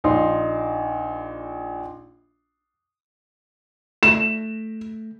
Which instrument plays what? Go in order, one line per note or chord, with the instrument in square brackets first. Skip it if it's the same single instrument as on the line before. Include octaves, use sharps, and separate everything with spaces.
[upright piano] A#1 D#4 D5 C6
[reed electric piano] A3 [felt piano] E7